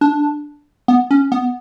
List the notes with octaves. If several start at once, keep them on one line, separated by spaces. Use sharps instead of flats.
D4
B3
C#4
B3